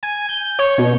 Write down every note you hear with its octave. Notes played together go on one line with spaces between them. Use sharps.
G#5
G6
C#5
B2